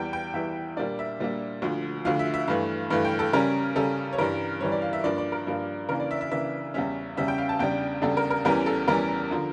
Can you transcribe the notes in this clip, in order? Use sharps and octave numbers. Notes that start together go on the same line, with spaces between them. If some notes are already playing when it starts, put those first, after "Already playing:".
Already playing: E2 E3 G3 G5
G5
E2 E3 G3 E5
A#2 G3 A#3 D4 D5
E5
A#2 G3 A#3 D4
D2 D3 F3
D2 D3 F3 F5
E5
E5
G2 E3 A3 F5
G2 E3 A3 F5
G5
A4
C#3 G3 C#4 A#4
C#3 G3 C#4 A4
C#5
G2 E3 G3 A#4
G2 E3 G3 C#5
D5
F5
E5
G2 F3 A#3 D4 D5
D5
A#4
G2 F3 A#3 D4
C#3 E3 A#3 D4 A#4
D5
E5
D5
E5
C#3 E3 A#3 D4 E5
E2 C#3 G3 C#4 E5
E2 C#3 G3 C#4 E5
G5
F5
A5
E2 C#3 G3 D4 G5
E2 C#3 G3 D4 A4
A#4
A#4
E2 E3 G3 C#4 A#4
A4
E2 E3 G3 C#4 A#4
D3 F3